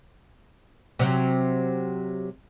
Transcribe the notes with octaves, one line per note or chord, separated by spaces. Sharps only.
C3 F#3